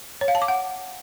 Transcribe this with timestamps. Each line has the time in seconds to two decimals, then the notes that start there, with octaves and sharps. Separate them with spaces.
0.21 C#5
0.28 F5
0.35 A5
0.42 D6
0.48 F#5